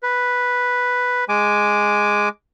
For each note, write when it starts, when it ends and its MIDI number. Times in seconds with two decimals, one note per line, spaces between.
0.03 1.25 71
1.29 2.29 56
1.29 2.29 80
1.29 2.29 86